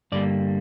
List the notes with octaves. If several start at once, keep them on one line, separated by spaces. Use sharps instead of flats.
G2 D3 G3 A#3 D5